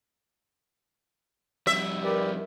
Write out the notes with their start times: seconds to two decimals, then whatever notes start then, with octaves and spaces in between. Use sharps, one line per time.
1.67 F2 G3 E5
2.04 G4 A#4 B4 D5